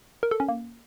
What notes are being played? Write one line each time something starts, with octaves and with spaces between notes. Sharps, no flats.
A#4
A4
C#4
A#3